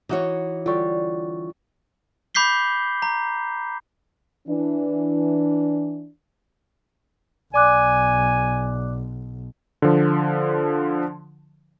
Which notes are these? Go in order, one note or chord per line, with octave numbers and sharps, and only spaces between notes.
E3 D#4 F#4 C#5
D3 G3 F4 C#6
B5 D6 G6 B6 C7 G7
A#5
E3 D4
B1 D5 G#5 D6 F#6
D3 F3